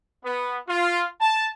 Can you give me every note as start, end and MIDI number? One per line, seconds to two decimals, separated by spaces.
0.24 0.56 59
0.68 1.05 65
1.21 1.48 81